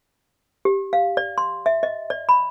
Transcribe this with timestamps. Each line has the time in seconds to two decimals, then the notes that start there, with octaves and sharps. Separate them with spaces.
0.65 G4
0.93 F5
1.17 D5
1.38 C6
1.66 E5
1.83 D#5
2.10 D5
2.29 B5